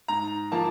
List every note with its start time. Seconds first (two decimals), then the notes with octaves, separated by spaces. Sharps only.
0.08 G#2 A#5
0.52 F3 A#3 A5